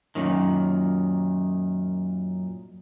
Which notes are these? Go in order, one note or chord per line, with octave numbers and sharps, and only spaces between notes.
F#2 A#2 D#3